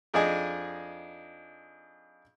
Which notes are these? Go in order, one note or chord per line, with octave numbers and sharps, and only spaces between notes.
F2 D4 D#4 G#4 D#5 G#5